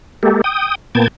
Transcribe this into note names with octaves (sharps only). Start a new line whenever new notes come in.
G#3 A#3 G4 A4
G5 D#6
A#2 A#3 B3 G5 A5 G#6